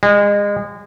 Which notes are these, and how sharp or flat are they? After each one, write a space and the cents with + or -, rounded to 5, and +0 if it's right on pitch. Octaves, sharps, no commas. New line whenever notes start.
G#3 -30